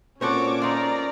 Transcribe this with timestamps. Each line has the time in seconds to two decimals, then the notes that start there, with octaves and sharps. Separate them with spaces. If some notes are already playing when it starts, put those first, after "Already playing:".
0.21 A#2 C4 C#4 F#4 A4 C#5 D6
0.62 D#4 F4 D5 A#5